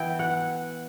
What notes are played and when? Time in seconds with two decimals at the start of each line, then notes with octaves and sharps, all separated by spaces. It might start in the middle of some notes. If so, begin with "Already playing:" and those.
Already playing: E3 B3 E4 G5
0.19 F#5